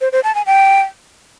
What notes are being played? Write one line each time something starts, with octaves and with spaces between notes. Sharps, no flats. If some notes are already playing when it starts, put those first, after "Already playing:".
C5
C5
A5
G#5
G5